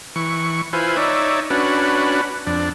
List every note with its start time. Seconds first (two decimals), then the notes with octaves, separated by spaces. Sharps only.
0.16 E3 C#6
0.73 E4 F4 B4 C5 G#5
0.97 D#4 C#5 D5 E5
1.50 C#4 D4 F#4 B4
2.47 F2 D4